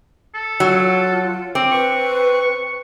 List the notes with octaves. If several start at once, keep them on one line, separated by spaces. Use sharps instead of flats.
A4
F#3 F4
C4 D6
B4 C#6